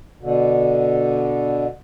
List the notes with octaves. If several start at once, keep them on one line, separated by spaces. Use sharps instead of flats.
B2 D3